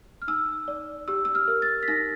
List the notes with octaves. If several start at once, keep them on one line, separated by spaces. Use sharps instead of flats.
F6
D#4 E6
D5
G4 E6
E6
F6
A#4
A6
B6
D#4 A#6